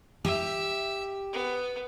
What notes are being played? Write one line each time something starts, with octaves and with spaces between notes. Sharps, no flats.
G4 E5
B3